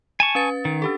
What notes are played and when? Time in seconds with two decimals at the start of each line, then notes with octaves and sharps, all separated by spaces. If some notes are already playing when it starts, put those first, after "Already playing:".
0.20 G#5 A5 C#6
0.35 C#4 B4 A6
0.65 D#3
0.82 D4 G4 A4